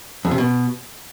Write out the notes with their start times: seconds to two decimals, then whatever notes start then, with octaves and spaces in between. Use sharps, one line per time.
0.25 F2
0.31 C3
0.38 B2